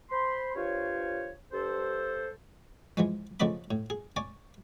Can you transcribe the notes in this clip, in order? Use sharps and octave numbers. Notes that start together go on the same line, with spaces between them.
C5 B5 C6
G2 F4 C5 C#5
G2 A4 C5
E3 F3 G#3
C#3 F3 A3 D5 D#5 B5
A2
G#4
C#5 D5 G#5